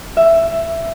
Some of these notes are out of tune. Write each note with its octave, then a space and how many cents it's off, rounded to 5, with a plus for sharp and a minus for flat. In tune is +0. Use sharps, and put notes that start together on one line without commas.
E5 +10